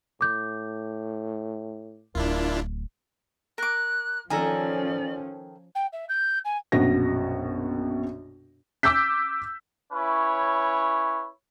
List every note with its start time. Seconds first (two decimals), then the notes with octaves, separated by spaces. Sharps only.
0.21 A2 D6 G6
2.15 D1 D4 E4 F4 A#4
3.58 A#4 D6 F#6
4.30 D#3 F3 C#4 A4 D5 G#5 A#5
5.75 G5
5.93 E5
6.09 G6
6.45 G#5
6.72 A#1 F#2 B2 F#4 A#6
8.83 D6 E6 G6 B6
9.93 C#4 E4 B4 C#5